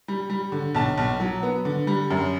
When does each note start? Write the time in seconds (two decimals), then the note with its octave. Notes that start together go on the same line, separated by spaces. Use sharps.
0.08 G3
0.30 G3
0.52 D3
0.75 B1 A5
0.98 B1
1.20 F#3
1.43 B3
1.65 D3
1.87 G3
2.10 F#2